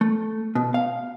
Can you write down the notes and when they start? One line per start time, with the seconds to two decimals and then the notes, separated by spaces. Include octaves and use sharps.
0.01 A3
0.55 B2
0.74 F5